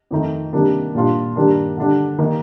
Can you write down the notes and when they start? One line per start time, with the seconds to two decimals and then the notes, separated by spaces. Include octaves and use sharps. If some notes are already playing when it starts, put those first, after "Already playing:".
0.11 F2 D#3 A3 D#4
0.53 C3 D#3 G3 A#3 D4
0.95 A#2 G3 D4 F4
1.36 G2 D#3 G3 A#3 D4
1.77 D3 G3 D4
2.18 D#3 A#3 D#4